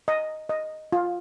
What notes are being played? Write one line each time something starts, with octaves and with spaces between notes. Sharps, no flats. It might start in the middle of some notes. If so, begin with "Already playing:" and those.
D#5
D#5
F4